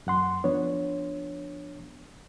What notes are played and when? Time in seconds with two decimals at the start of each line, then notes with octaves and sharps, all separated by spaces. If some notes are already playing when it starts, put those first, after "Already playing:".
0.07 F#2 F#5 C6
0.44 F3 B3 D4 C#5